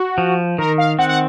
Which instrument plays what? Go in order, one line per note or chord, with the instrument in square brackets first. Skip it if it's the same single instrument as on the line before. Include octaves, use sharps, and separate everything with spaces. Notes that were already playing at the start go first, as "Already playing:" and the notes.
Already playing: [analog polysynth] F#4
[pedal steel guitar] F3
[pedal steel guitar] D#3 [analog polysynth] A#4
[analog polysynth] F5
[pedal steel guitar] C4 [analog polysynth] F#5
[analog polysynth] F#5